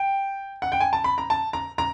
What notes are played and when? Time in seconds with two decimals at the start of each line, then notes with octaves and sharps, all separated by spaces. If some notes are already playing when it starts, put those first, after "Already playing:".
Already playing: G5
0.62 F#5
0.72 G5
0.80 G#5
0.93 A5
1.04 B5
1.18 A#5
1.30 A5
1.53 A#5
1.78 A#5